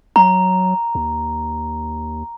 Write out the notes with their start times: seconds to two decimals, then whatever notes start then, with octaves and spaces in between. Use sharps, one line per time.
0.16 F#3 A#5
0.95 D#2